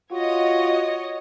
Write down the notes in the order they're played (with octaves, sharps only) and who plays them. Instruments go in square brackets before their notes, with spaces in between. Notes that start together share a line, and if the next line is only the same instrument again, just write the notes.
[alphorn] F4 [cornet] F#4 [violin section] C#5 D#5